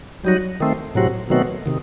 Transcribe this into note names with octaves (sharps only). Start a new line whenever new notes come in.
F#3 G3 D#4 F#4
D#3 A3 C4
A2 C3 F#3 C4 F#4
B2 D#3 F#3 A3 C4 F#4
C3 D#3